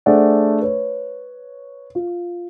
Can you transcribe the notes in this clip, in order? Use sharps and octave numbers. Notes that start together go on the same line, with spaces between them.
A3 D4 G#4 C5 D5 F#5
B4 C#5
F4